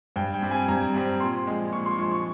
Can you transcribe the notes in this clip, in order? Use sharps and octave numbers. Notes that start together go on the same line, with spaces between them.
G2 G5
G5
G3 C4
G#5
G2 A#5
G3 C4
A#2 C6
F3 G#3
A#2 C#6
C6
F3 G#3 C#6
C#6